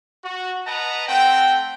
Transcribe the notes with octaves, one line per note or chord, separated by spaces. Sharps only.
F#4
B4 D#5 F#5 A5 A#5
A3 C4 F#5 G5